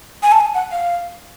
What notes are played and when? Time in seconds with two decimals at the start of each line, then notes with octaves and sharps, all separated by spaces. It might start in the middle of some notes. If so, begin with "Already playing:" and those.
0.23 G#5
0.32 A5
0.40 G#5
0.54 F#5
0.71 F5